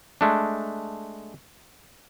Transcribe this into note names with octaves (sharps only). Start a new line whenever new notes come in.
G#3 A3 D4